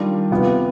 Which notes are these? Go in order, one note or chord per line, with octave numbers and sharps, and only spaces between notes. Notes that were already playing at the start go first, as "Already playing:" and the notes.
Already playing: D#3 G3 D4 F4
C3 F3 B3 F4